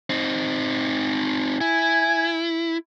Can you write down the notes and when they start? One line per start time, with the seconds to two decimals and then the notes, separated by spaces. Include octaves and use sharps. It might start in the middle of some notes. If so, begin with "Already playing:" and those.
0.10 C4 D#4
1.61 E4 G#5